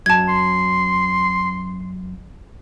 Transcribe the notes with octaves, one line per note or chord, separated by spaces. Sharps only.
F#2 A5 G#6
C6